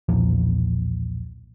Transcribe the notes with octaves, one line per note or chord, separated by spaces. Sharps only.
B1 E2 A#2 F3